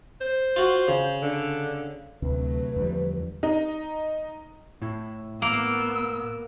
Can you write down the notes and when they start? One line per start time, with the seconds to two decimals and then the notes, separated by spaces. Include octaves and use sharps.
0.21 C5
0.56 F4 F#4
0.88 C#3
1.22 D3
2.22 D2 C3 F#3 A3 B4
2.76 E2 D3 F3 G3
3.43 D#4
4.82 A2 E4
5.42 A#3 B3 E6